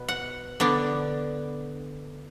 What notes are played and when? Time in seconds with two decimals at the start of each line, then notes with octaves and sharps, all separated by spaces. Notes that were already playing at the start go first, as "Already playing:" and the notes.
Already playing: B2 B3 B4
0.08 F#5
0.60 D3 B3 D4